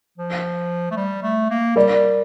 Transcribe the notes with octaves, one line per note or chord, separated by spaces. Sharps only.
F3
A3
G3
A3
A#3
G3 A#4 D5